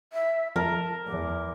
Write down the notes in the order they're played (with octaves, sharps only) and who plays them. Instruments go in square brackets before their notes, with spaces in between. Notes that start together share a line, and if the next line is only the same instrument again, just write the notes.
[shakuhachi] E5
[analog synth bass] F2 [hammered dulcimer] A#4 [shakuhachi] A5
[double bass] E2 [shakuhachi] D6